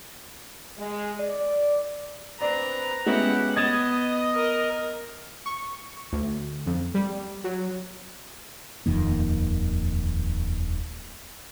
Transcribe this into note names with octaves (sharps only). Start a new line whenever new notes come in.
G#3
D5
C4 D4 B4 D5 A#5
G#3 B3 C#4 E4 F#4 G4 F#5
B3 D#5 G#6 A6 E7
A#4
C#6
D2
F2
G3
F#3
D#1 F2 D#3 A#3